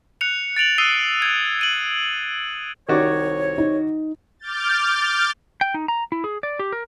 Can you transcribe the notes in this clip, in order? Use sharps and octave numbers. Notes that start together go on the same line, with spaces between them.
F#6 C#7 F7
A6 D7 F7 F#7
D#6 E6 F#6 C7 D#7 G7
F#6 G#6
D7 D#7 F#7
C2 D#3 F#4 C#5 D5
D#4
D6 F6 G6 A6
G5
D#4
A#5
E4
G#4
D5
G4
A#4